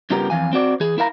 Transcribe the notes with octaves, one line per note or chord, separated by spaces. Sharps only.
G2 C#3 B3 F4 G4 A#4
F2 E3 F5 G#5
C4 F#4 D5
E3 G#4
E4 A#4 F5 A#5